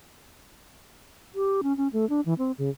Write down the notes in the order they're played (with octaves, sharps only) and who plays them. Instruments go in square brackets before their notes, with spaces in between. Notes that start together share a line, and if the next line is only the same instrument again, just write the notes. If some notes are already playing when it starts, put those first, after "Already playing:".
[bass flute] G4
C#4
C#4
A3
D4
E3
C4
C#3